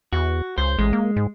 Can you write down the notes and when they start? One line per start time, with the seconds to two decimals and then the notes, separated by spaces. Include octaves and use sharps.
0.13 E2 F#4
0.58 C#2 C5
0.79 A1 G#3
0.93 A#3
1.16 G#2